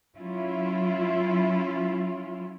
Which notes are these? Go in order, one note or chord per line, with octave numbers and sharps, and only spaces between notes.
F#3 C#4 E4 F4